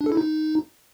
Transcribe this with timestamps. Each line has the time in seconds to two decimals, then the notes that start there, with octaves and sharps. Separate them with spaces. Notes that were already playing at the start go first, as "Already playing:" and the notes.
0.01 D4
0.06 A4
0.12 E4
0.17 D#4